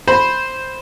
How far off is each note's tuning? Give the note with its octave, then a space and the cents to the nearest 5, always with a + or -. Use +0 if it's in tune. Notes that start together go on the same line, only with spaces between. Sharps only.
C5 +0 B5 +0